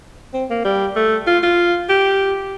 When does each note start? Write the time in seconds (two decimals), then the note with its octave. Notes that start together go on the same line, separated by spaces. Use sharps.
0.34 C4
0.50 A#3
0.64 G3
0.96 A3
1.27 F4
1.43 F4
1.89 G4